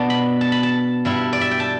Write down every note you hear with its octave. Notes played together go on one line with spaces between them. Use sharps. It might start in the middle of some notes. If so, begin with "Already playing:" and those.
Already playing: B2 B3 D4 A5
B5
A5
B5
A5
G2 G3 E4
D5
E5
G5
A5